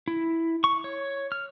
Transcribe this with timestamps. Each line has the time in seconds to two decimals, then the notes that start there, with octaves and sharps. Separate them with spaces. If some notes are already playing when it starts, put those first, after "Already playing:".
0.08 E4
0.64 C#6
0.84 C#5
1.32 F6